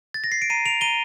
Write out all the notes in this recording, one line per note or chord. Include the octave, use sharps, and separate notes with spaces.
A6
A#6
C7
D7
A#5 C7 D#7
D7 F7
A#5 D#7 G7